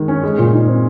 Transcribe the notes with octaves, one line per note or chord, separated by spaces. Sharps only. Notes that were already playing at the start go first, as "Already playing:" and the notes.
Already playing: D#3 G#3
C#4
G#3
A#2
D#4
C4